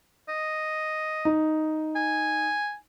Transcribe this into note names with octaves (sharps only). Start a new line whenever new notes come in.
D#5
D#4
G#5